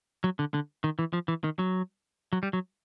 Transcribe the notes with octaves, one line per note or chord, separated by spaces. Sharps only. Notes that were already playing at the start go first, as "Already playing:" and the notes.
F#3
D3
D3
D#3
E3
F3
E3
D#3
F#3
F#3
G3
F#3